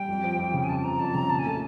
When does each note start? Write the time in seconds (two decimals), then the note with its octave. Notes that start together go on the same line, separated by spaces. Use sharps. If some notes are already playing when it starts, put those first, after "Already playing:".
Already playing: G3 G5
0.08 F2
0.23 F3
0.38 F2
0.54 C#3
0.64 G#5
0.69 F2 A5
0.84 F3 A#5
1.00 F2 A5
1.14 C#3 A#5
1.30 A#2 A5
1.39 G#5
1.46 A3 A5